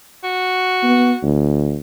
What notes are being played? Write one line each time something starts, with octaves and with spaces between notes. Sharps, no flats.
F#4
B3
D2